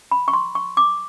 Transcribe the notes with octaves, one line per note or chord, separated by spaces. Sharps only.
B5
C#6
C6
C#6
D6